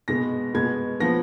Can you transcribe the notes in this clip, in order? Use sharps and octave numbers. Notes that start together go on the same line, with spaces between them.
B2 G#3 B3 A#6
B2 G#3 B3 G#6
F3 B3 A#6